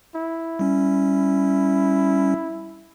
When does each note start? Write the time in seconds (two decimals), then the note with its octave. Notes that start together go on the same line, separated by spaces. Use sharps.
0.15 E4
0.59 G3 C#4